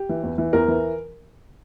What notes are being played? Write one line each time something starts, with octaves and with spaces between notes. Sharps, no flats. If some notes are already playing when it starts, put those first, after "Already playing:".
Already playing: G4
E3
E2
E3
E2 A#4
E3